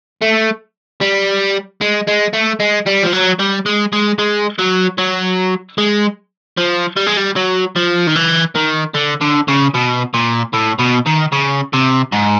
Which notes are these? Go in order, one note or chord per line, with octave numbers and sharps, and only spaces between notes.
A3
G3
G#3
G#3
A3
G#3
G3
F3
F#3
G3
G#3
G#3
G#3
F#3
F#3
G#3
F3
G3
G#3
G3
F#3
F3
D#3
E3
D#3
D3
D3
C#3
B2
A#2
A2
B2
D#3
C#3
C3
G#2